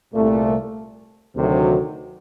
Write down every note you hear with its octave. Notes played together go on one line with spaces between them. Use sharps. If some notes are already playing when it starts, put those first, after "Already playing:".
C2 A#2 A3
D2 C3 D#3 F#3